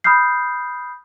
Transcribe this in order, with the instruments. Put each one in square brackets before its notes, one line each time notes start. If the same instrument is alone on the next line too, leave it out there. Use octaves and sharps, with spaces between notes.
[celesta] B5 D#6 F6 G6 C7